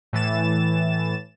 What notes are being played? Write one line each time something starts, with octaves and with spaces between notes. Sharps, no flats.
A2 E3 A6 E7